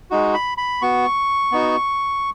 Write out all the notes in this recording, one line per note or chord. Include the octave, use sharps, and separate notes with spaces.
G#3 D#4 F#4
B5
B5
B3 F#4 C#6
B3 D#4 F#4